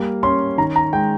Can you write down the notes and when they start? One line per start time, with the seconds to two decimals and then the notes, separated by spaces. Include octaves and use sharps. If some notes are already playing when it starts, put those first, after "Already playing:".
Already playing: G3 A#3
0.23 C#4 C6
0.58 D#3 A#5
0.76 A#5
0.93 G#3 G5